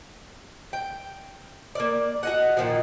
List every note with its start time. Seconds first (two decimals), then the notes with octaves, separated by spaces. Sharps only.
0.73 G5
1.75 A#3 D5
2.23 F#4 D#5 F#5
2.57 A#2 D#3 F3